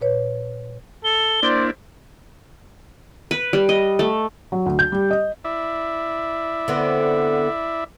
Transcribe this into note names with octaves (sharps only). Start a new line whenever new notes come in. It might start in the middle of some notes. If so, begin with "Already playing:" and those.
A#2 B4 C#5
A4 G7
A#3 D4 E4 C5 D5
B4
G3
D#5
A3
F#3
D2
G6
G3
D#5
E4 D5 E5
D3 B3 C4